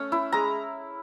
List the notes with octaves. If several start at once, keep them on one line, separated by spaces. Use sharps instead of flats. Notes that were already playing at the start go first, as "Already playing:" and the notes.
Already playing: A3 C#4
E4
G#3 A#5